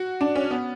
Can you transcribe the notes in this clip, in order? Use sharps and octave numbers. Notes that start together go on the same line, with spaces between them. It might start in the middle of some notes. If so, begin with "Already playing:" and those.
Already playing: F#4
D4
C#4
B3